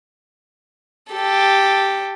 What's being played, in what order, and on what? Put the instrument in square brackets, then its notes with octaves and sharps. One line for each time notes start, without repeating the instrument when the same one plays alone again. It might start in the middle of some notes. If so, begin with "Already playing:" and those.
[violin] G4 A4